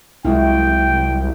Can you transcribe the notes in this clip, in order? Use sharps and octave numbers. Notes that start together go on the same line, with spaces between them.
C2 F#3 G#3 E4 F4 G5